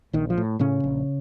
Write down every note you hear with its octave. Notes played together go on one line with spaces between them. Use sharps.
A#1 D#3
F3
A2
A2 C#3 C#4
A#1